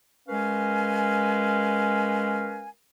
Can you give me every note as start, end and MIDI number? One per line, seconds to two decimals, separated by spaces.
0.28 2.67 56
0.28 2.67 61
0.28 2.67 70
0.28 2.67 71
0.28 2.67 77
0.28 2.67 80